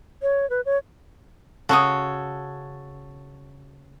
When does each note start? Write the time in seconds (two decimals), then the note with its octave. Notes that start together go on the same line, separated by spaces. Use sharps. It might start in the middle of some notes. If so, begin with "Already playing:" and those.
0.22 C#5
0.50 B4
0.66 C#5
1.69 C#3 F#4 A4 C#5 D#6